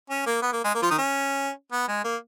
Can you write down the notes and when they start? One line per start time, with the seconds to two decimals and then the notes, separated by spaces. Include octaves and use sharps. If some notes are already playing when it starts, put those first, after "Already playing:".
0.10 C#4
0.26 A#3
0.42 B3
0.52 A#3
0.64 G#3
0.75 A#3
0.82 F3 F4
0.90 D#3 D#4
0.98 C#4
1.72 B3
1.88 G#3
2.04 A#3